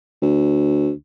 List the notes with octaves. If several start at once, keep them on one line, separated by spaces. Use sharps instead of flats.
D2